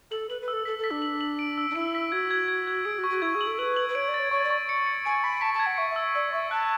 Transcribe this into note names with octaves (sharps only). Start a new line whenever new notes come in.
A4 F#7
B4 F#7
B4
E6
A4
A4 B6
A4
B6
D4
F#7
F#7
D7
E6
D4
E4 D7
B6
F#4 G#6
G#6
G#6
G#6
G#4 D7
F#4
C#6
F#4
E4 G#6
G#4
F#7
A4
B4 F#7
F#7
B4
C#5 D7
D5
A6
C#5
C#5 C#6
D5
C#6
C#7
C#7
G#5 D7
B5 B6
A5 B6
A5
G#6
F#5
E5 C#6
E5
E6
D5 E6
E5 C#6
A5 F#6